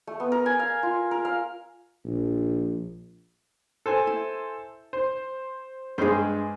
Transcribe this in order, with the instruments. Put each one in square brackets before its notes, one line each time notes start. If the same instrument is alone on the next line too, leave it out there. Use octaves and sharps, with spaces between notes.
[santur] A3
B3
A#4
G#5
F5
F4
A#4
F5
[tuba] A#1
[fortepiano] A4 C5 G#5
[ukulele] E4
[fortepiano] C5
[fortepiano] G2 G#3 [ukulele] G#4 C5